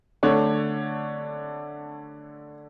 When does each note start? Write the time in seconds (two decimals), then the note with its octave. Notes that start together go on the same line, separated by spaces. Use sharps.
0.23 D3 A3 D4 C#5